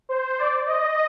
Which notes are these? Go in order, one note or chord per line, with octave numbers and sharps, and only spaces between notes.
C5
D5
D#5